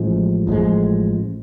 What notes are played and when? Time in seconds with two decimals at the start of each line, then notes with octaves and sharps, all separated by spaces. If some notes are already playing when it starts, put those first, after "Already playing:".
Already playing: A1 A2 F3 G#3
0.47 A1 A2 F3 G#3